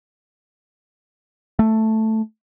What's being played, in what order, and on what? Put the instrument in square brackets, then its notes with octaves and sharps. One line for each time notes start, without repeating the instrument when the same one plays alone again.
[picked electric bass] A3